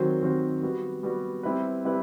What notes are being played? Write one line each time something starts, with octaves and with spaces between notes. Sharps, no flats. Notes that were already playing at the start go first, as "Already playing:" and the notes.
Already playing: D#3 F#3 C4 F#4 C5
D#3 F#3 C4 F#4 C5
G3 B3 F#4
G3 B3 F#4
G3 C4 E4 B4
G3 C4 E4 B4